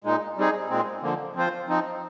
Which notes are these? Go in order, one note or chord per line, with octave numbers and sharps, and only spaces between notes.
A#2 G#3 D#4
G3 C4 D#4 G#4
A#2 G#3 C4
D3 F3 A#3
F3 C4 F4 C5
F3 C4 D#4